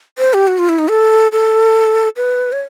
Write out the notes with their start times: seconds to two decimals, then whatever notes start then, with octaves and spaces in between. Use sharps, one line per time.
0.18 C5
0.34 G4
0.47 F#4
0.58 F4
0.69 E4
0.79 D#4
0.90 A4
1.32 A4
2.17 B4
2.52 C#5